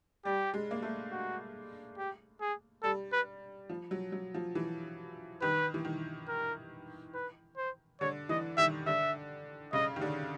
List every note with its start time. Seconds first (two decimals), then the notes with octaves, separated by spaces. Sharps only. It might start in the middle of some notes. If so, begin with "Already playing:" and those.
0.25 G3 G4
0.54 G#3
0.71 A#3
0.83 A3
1.12 F#4
1.97 G4
2.41 G#4
2.83 G3 A4
3.12 B4
3.70 F3
3.91 F#3
4.12 F#3
4.34 F3
4.55 E3
5.42 D#3 B4
5.74 E3
5.85 D#3
6.28 A#4
7.14 B4
7.57 C5
8.01 D3 C#5
8.29 E3 D#5
8.57 D#3 E5
8.86 D3 E5
9.73 C#3 D#5
9.96 D#3
10.02 D3